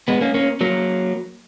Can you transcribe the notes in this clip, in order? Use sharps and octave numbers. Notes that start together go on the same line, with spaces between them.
G#3 B3
A#3 C#4
A#3 C#4
F#3 A#3